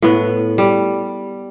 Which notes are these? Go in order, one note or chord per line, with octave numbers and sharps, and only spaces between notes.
A2 B3
G3